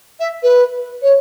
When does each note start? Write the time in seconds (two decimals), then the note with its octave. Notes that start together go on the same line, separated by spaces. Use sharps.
0.19 E5
0.42 B4
1.02 C#5